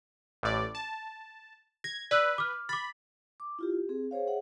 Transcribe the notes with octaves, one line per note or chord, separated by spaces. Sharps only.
A1 A2 D5
A5
G#6 A#6
B4 D5 E6 F#6
D6 F6
B5 D6 A6
D6
E4 F4 G4
G4
C4 G#4
G#4 C5 C#5 F5
G#4 C#5 E5 F#5